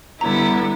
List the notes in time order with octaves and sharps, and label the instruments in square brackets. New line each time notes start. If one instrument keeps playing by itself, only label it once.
[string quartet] D3 G3 B3 E4 [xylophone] A#5